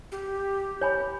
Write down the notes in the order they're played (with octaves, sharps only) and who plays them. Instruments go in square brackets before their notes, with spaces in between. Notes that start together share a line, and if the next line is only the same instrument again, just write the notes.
[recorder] G4
[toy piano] C#5 G#5 B5